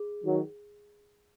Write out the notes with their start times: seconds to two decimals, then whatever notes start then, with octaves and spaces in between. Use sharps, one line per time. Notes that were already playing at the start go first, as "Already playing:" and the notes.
Already playing: G#4
0.24 D#3 F#3